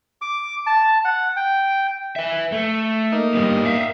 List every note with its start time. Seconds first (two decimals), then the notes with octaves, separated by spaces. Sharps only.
0.22 D6
0.66 A5
1.05 F#5
1.36 G5
2.16 B4 E5
2.52 A3
3.12 A#3 D#4
3.35 G2 G3 B3
3.65 E5 F5